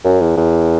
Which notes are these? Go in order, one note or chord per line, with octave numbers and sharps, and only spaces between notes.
F#2
E2
E2